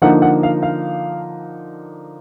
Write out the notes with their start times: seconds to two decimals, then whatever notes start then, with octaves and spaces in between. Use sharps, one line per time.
0.02 D3 F3 A#3 D#4 F#5
0.22 F#5
0.43 F5
0.63 F5